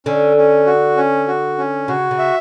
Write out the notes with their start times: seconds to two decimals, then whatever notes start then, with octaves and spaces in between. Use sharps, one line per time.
0.06 D3 C#4
0.37 C#4
0.67 F#4
0.97 C#4
1.28 F#4
1.58 C#4
1.88 C#3 F#4
2.11 C#3
2.18 E5